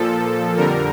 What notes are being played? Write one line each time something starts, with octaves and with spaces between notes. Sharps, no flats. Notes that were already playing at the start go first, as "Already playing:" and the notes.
Already playing: A#2 F3 A4
F2 D3 G3 A#4